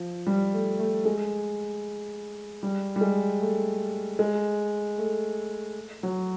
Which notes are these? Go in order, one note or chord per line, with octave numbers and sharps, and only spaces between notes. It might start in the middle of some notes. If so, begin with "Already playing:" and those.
Already playing: F3
G3
A3
A3
G#3
G3
G3
G#3
A3
G#3
A3
F#3